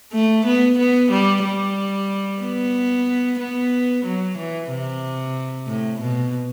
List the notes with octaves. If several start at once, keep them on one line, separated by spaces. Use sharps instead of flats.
A3
B3
B3
G3
G3
B3
B3
F#3
E3
C3
A2
B2